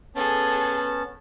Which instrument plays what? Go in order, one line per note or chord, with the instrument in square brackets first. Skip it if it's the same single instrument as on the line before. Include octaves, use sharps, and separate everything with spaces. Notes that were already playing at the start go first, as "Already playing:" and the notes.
[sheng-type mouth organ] B3 C#4 A5 [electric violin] G#4 A4